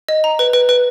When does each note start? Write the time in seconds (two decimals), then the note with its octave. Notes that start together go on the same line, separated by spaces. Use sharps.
0.09 D#5
0.24 A#5
0.39 B4
0.53 B4
0.69 B4